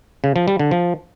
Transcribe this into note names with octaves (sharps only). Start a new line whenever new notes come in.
C#3
F3
G3
D3
F3